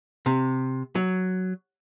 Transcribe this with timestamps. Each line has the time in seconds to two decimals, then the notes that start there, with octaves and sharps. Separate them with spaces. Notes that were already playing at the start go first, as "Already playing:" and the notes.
0.26 C3
0.95 F#3